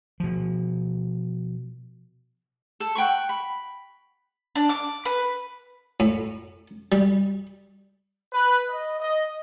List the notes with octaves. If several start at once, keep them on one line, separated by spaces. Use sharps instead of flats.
B2 F3
A4
F#5 G5 B5 C#6
B5
D4
D6
B4
A2
G3
B4
D#5
D#5